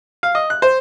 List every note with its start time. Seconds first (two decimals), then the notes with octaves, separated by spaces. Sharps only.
0.23 F5
0.35 D#5
0.50 F#6
0.62 C5